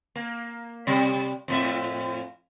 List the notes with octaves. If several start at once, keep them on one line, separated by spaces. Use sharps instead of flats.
A#3
C3 G3
F2 A2 E5